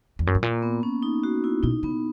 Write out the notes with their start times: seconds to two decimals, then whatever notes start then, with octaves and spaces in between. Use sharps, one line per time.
0.19 E2
0.27 F#2
0.35 G#2
0.43 A#2 A#3
0.62 B3
0.83 C#4
1.03 D#4
1.23 F#4
1.44 E4
1.63 B2 D#4
1.83 C#3 B3